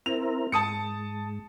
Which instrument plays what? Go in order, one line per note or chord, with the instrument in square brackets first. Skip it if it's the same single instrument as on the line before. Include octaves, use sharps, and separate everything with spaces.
[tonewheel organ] C4 E4 A#4 [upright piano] F7
[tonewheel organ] G#2 [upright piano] A5 D#6 C#7